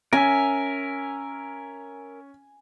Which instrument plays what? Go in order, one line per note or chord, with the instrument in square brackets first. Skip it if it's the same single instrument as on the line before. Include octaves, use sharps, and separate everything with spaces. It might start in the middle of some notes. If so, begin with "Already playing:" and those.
[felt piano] C#4 [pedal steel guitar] A#4 E5 [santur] G#5